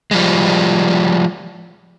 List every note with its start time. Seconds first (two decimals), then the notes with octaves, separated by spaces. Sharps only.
0.11 F3 G3 G#3